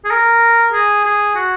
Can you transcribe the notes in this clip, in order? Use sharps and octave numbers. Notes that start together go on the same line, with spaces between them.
G#4
A#4
G#4
G#4
F#4